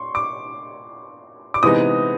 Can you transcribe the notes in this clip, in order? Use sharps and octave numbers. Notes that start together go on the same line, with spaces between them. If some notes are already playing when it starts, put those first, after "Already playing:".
Already playing: C6 C#6
D6
D6
C3 E3 G#3 B3 D#4 D#6